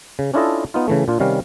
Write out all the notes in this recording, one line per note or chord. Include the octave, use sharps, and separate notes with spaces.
C#3
C#4 D4 E4 F4 A4 D#5
B3 D#4 F4
C#3 E3 A3
A#2 D4 F4
C3 D#3 G3 C#4 F5